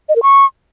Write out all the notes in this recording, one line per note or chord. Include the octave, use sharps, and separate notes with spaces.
D#5
A#4
C#6